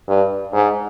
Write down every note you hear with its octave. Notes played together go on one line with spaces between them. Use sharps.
G2
G#2